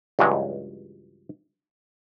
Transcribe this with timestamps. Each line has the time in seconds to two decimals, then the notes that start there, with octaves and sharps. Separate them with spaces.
0.19 C#2 G2 E3 F#3 G#3